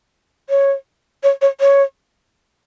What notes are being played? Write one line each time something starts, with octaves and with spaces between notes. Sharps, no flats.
C#5
C#5
C#5
C#5